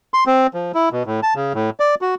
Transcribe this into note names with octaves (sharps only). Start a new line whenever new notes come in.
C6
C4
F3
E4
B2
A2
A5
C#3
A2
D5
F#4